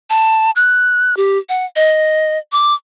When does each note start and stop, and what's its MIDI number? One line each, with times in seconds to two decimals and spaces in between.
0.10 0.51 81
0.56 1.17 90
1.17 1.38 67
1.49 1.65 78
1.76 2.38 75
2.52 2.74 86